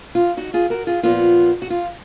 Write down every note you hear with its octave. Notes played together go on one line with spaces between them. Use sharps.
F4
D#4 F#4
F4 G#4
F#4 A#4
F4 G#4
A#2 F3 B3 F4
F#4
F4